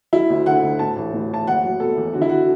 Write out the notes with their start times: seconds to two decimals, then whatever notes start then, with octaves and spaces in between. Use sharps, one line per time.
0.13 F#3 E4
0.30 D2
0.46 D3 F#5
0.63 D2
0.79 A2 A5
0.96 A1
1.13 A2
1.30 A1 A5
1.47 F#1 F#5
1.64 F#3
1.80 B2 A4
1.97 E2
2.13 D3 F#4
2.22 E4
2.29 D3 F#4